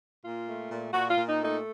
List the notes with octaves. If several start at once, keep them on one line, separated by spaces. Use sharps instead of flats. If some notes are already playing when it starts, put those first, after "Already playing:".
A#2 F4
A3
A#2
A#2 F#4
F4
A#2
D#4
A3
D#4